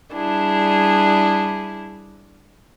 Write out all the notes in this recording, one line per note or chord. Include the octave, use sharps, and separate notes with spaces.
G3 D4 E4 G#4